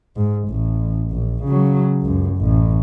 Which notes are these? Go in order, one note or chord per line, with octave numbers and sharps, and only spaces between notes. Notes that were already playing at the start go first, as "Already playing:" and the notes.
G#2
A1
A#1
C#3 F#3
C#2 F#2
A1